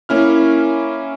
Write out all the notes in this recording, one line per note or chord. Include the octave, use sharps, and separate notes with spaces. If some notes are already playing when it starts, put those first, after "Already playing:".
A#3 C#4 E4 F6